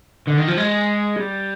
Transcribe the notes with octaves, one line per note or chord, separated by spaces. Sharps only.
D3
D#3
F3
G#3
G3